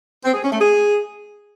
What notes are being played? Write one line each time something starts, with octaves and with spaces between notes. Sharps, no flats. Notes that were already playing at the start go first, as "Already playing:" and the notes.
C4
G#4
C#4
A3
G#4